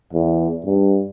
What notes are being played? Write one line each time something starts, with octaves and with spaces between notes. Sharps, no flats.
E2
G2